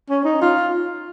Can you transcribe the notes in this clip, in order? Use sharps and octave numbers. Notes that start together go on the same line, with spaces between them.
C#4
D#4
F4